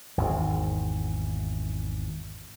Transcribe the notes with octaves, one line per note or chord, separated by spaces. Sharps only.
G#1 E2